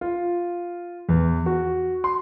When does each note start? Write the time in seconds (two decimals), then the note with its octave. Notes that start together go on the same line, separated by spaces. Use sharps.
0.01 F4
1.09 E2
1.46 F#4
2.04 C6